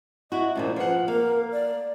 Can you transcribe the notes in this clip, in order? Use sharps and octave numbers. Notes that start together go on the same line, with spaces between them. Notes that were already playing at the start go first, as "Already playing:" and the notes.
E4 F#4 D#5
D#2 A#2 F3 C#4
F3 B4 F#5
A#3 A#4 F5
D5